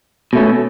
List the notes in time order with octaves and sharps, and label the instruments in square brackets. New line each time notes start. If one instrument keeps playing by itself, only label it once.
[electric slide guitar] B2 A3 C#4